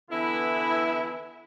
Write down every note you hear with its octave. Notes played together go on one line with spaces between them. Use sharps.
D3 E3 B3 E4